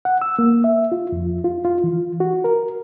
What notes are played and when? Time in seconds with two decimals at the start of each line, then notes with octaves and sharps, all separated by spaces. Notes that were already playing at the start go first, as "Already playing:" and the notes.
0.05 F#5
0.22 E6
0.39 A#3
0.64 E5
0.92 F4
1.12 F2
1.44 F4
1.65 F4
1.84 E3
2.20 F#4
2.44 A#4